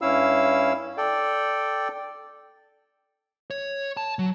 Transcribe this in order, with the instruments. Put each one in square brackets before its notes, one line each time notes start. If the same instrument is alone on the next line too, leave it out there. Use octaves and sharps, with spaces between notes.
[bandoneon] G2 C#4 E4 F5 E6
A4 D5 G5
[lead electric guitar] C#5
A5
F#3